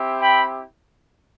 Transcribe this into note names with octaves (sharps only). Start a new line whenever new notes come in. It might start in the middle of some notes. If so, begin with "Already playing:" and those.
Already playing: C4 E4 G4
G5 B5